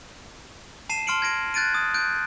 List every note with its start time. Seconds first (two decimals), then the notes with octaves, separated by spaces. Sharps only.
0.89 A5 C7 D#7 E7
1.07 A5 C6 F6 C#7 D7 F#7
1.22 G#6 A#6 D7
1.54 F#6 G#6 A6 D7 D#7
1.72 D#6 G#6
1.94 F#6 G6 D7